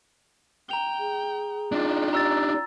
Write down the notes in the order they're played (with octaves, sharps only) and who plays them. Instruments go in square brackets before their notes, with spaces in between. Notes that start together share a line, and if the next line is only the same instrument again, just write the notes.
[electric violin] G5 [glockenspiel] A#5 F7 G7
[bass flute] G#4
[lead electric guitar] D4 D#4 [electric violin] F4 G5
[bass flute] G4 [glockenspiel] A#5 E6 A6